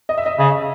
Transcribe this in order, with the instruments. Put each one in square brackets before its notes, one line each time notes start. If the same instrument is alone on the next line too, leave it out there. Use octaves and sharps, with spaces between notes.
[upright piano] D#5
E5
D#5
[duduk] C#3 [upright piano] E5